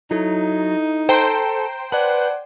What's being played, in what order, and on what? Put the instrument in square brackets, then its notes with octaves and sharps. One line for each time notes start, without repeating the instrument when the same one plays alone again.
[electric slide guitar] F#3 [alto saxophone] D#4 [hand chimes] E4 A4
[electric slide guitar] A4 [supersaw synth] C5 G5 [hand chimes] A#5
[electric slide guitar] B4 [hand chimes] D5 A5 [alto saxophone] F#5